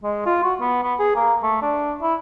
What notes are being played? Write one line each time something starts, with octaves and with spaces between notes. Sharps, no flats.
G#3
F4
F#4
B3
B3
G#4
A#3
A3
D4
E4